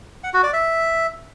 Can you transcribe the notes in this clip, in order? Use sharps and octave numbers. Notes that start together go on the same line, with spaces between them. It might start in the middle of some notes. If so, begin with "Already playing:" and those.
F#5
F#4
D5
E5